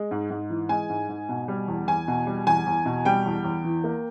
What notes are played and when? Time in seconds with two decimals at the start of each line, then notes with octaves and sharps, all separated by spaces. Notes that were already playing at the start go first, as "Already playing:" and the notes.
Already playing: G#3
0.11 G#2
0.30 G#2
0.50 E3
0.69 G#3 G#5
0.89 G#2
1.09 G#2
1.29 B2
1.48 G3
1.68 E2
1.87 E2 G#5
2.08 B2
2.27 G3
2.47 E2 G#5
2.66 E2
2.85 B2
3.05 G3 G5
3.25 E2
3.44 E2
3.64 E3
3.84 A#3